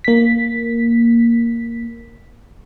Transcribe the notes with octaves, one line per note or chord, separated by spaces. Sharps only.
A#3 B6